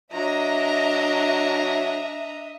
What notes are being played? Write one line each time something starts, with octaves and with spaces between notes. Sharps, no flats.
F#3 D4 D#5 E5 A#5